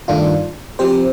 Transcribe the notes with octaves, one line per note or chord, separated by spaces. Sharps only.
G2 D#3 A3 D4 F4
F3 C4 G4 C5